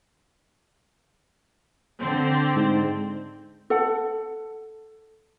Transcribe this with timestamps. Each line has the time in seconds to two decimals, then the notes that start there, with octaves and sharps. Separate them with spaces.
2.01 D3 C4
2.56 G#2
3.70 A4 F#5